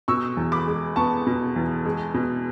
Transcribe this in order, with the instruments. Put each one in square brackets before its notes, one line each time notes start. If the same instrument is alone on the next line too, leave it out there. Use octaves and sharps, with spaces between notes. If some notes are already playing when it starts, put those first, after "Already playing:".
[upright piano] B2 C#6 E6
E2
B5 D6
G#3
B3 A5 C#6
B2
E2
G#3
B2